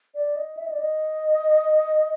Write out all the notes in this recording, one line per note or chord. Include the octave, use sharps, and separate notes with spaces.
D5
D#5
E5
D#5
D5
D#5